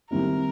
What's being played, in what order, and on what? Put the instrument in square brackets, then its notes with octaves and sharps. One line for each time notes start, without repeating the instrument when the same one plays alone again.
[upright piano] D#3 G3 C4 E4 [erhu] A#4